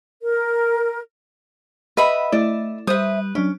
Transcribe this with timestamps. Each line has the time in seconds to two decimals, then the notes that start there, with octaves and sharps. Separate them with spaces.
0.22 A#4
1.97 B4 D#5 E5 F#5 B5
2.32 A3 E4 D5
2.87 G3 B4 C5 E5 D#6
3.35 F#3 C#4 D4